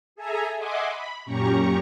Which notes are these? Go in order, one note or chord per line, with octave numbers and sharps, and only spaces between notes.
G#4 A4 E5 G#5 A#5
D#5 E5 F#5 G#5 C6 D6
B5
F#2 A#2 C#4 G4 A#5 C#6